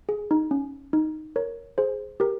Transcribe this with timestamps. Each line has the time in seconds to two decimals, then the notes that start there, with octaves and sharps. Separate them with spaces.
0.09 G#4
0.31 D#4
0.51 C#4
0.93 D#4
1.36 A#4 C#5
1.78 G#4 C5
2.20 G4 A#4